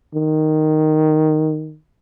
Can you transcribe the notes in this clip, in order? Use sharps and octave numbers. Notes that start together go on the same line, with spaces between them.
D#3